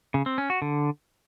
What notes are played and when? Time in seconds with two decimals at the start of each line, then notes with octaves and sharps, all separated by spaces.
0.14 C#3
0.26 C4
0.38 C#4
0.50 F#4
0.62 D3